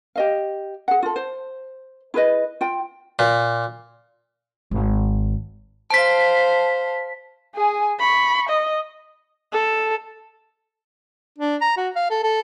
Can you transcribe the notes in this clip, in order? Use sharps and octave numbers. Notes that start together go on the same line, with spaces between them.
G4 D#5 F5
G#4 F#5
F4 A4
C5
E4 G#4 B4 D#5
F4 G5
A#2
G#1
C5 F5 A5 B6
G#4 G#5
B5 C#6
D#5
A4
D4
A#5
F#4
F5
A4
A4